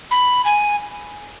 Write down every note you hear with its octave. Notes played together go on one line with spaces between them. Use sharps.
B5
G#5